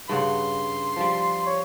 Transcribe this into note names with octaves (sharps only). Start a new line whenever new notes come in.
G2 C#3 F#5 C6
F3 G3
C#5